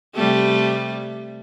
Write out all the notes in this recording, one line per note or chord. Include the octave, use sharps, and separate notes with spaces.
C3 G3 A3